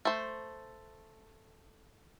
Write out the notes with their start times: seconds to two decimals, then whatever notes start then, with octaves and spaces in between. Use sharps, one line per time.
0.05 A3 C5